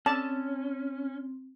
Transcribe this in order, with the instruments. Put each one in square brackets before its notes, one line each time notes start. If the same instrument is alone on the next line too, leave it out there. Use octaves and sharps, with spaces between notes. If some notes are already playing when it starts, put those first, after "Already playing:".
[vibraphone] C4 [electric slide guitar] C#4 [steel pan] A5